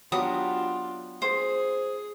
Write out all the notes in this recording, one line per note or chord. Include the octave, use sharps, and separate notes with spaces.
F#3 B3 D4 F4 G4 D#6
G#4 C5